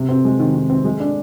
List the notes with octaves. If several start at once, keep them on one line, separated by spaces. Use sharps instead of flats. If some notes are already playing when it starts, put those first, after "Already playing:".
Already playing: C3
C4
G#3
D#3
D#3
C4
G#3
D4